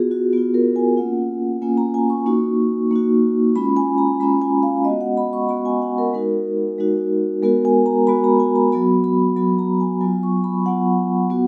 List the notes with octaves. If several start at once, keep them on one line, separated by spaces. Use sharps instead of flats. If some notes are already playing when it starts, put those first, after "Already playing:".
Already playing: B3 F4 F#4 G#4
F#4
B3 F4 F#4
A#4
G#5
A#3 C#4 F4 F#5
A#3 C#4 F4 G#5
A#5
G#5
C#6
A#3 D#4 F#4
A#3 D#4 F#4
G#3 C#4 F4 B5
G#5
A#5
G#3 C#4 F4 B5
G#5
F5
G#3 B3 F#4 D#5
F#5
B5
C#6
G#3 B3 F#4 B5
G#5
F#5
A#4
G#3 D#4 F#4 A#4
G#3 D#4 F#4
G#3 B3 F#4 A#4
G#5
A#5
G#3 B3 F#4 B5
A#5
G#5
A#5
F#3 B3 F#4 B5
B5
F#3 B3 F#4 B5
A#5
G#5
F#3 B3 F4 G#5
C#6
B5
F#3 B3 F4 F#5
B3 F#4